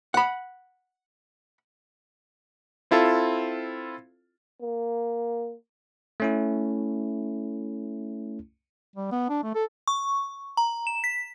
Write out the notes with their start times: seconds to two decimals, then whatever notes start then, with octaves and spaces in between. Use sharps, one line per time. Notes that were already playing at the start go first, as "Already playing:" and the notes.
0.14 F#5 B5
2.91 C4 E4 F4 A4
4.61 A#3
6.20 A3 C#4 E4
8.96 G3
9.11 B3
9.29 D4
9.43 A3
9.55 A4
9.88 C#6
10.57 A#5
10.87 E7
11.04 B6